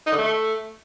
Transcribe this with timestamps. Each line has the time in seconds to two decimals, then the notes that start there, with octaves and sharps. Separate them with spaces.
0.06 D#4
0.12 D3
0.18 A3